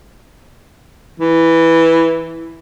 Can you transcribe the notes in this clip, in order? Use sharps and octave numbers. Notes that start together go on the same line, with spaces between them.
E3